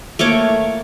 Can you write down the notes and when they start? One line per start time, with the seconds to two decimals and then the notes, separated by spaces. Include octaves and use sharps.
0.19 A3 A#3 C#5 D6